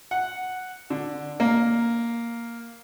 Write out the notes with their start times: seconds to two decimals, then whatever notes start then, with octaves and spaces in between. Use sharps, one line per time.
0.11 F#5
0.90 D3
1.40 A#3